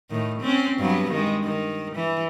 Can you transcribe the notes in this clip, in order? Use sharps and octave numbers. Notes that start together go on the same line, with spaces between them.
A2 D#3
C4 C#4
G2 F#3 B3
D#3 G#3
D#3
E3